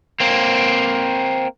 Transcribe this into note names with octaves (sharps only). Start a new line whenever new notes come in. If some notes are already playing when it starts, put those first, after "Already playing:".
A#3 C4